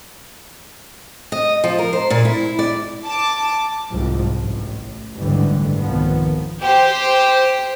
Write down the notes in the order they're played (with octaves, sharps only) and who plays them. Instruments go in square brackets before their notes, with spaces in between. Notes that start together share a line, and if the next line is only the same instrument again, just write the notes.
[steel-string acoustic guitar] D#5
F3
A#4
C5
A#2
E4
D5
[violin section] A5 D6
[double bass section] C2 G#2 F3
A1 A2
F#1 D2 G#2 D3 E3 G3
F1 C2 G#2 D#3 F3 B3
[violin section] G4 C5